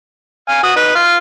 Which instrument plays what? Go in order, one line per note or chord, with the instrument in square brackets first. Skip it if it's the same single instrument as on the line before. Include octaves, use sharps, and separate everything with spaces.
[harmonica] F5 G#5
F#4 D#6
D#4 B4
F4 F6